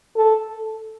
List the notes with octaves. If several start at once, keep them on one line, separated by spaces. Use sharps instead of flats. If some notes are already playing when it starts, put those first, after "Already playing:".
A4